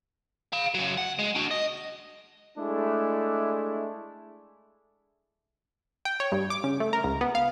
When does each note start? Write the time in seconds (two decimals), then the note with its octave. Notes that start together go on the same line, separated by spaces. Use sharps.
0.53 F5 B5
0.75 C#3 F#3
0.97 F#5
1.19 G#3
1.35 D4 F#4
1.51 D#5
2.57 G#3 A3 D4 E4
6.05 G5
6.20 C#5
6.32 G2
6.50 D6
6.64 C#3
6.80 A3
6.93 A#4
7.04 C#2
7.21 B3
7.35 F5